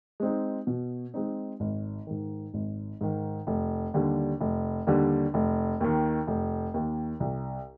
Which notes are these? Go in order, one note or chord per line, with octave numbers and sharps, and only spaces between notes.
G#3 C4 D#4
B2
G#3 C4 D#4
G#1
G#2 D#3
G#1
G#2 D#3
F1
D#2 D3 G3
F1
D#2 D3 G3
F1
D#2 D#3
F1
D#2 D#3
C2